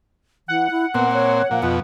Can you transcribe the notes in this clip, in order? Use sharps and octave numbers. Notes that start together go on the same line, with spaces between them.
E3 F#5
E4
A#2 B3 C4
C#5
A#2 F3
F2 B2 F4